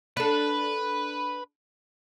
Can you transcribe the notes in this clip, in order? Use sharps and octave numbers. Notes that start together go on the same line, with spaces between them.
D4 A4 B4